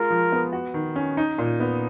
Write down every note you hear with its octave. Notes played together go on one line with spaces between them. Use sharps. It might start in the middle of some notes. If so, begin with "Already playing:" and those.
Already playing: G#3 F4 A#4
F3
B3
F#4
D#3
C#4
D#4
A#2
B3